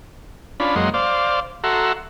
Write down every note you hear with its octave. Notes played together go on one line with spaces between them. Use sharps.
C#4 D4 F4 B5
F#2 G#3 A#3 D#5 F#5 C6
C5 D5 F5
F#4 A4 E5 F#5 A#5 C6